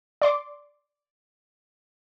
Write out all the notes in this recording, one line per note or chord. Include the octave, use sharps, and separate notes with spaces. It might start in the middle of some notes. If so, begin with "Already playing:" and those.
D5 C6 D6